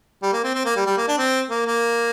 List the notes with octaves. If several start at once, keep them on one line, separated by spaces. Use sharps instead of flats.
G3
A#3
C4
C4
A#3
G3
G3
A#3
D4
C4
A#3
A#3